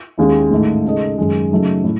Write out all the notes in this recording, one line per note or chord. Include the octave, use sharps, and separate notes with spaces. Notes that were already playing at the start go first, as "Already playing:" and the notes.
D#2 D#3 G#3 C#4 E4
A1 G#2 D#3 A3 D#4
C#3 G#3 D#4 A4 D#5
F#2 D#3 G#3
C#3 F#3 A3 D#4
A2